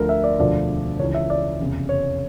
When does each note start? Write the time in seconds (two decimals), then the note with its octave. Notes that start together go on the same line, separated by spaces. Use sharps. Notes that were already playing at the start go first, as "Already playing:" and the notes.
Already playing: D2 D3 F3 A#4
0.09 E5
0.24 D5
0.39 E1 D2 D3 F3 D5
0.99 C#2 C#3 E3 C#5
1.14 E5
1.30 D5
1.60 F1 E2 C#3
1.89 C#5